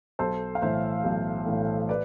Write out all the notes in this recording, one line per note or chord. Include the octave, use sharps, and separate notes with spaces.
B1 A4 C5
F5
A2 E3 A3 C5 E5
B1
A2 E3 A3
B4 D5